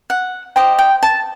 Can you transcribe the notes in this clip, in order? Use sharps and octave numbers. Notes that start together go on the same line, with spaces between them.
F#5
G4 C5 D#5 G5
G5
A5